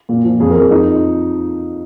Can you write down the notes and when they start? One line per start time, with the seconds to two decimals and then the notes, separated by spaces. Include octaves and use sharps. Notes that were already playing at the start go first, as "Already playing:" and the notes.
0.09 A#2
0.24 F3
0.40 F2 G#4
0.50 A#4
0.55 F2 G#4
0.70 F3 D#4